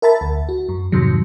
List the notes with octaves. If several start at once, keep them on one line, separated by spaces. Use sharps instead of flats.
A#4 E5 A5 B5 A6
D2
F#4
F#2
F2 G#2 C3 D#3 F#3